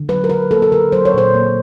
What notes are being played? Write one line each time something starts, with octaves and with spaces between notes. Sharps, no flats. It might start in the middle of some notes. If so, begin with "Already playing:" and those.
Already playing: D3
F#3 B4
A#4
D3 B4
A#3 A4
A4
D3 A#4
F#3 C5
C#5
A#2 C5
A#3